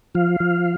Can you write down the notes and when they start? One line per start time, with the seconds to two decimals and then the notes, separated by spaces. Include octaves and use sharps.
0.15 F3 F5
0.40 F3